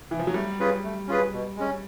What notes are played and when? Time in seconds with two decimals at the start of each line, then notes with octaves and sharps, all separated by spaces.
0.11 E3
0.19 F3
0.27 F#3
0.34 G3 A3
0.59 C#4 F4 G#4 B4
0.84 A3
1.08 C#4 F4 G#4 B4
1.32 B2
1.56 G#3 C#4